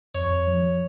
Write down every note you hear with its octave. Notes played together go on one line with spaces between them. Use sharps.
F2 C#5
F3